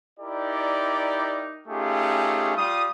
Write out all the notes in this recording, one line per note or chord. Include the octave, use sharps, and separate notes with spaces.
D#4 E4 G4 A#4 D5
A3 C#4 D#4 F4 G4 G#4
G3 F4 D#6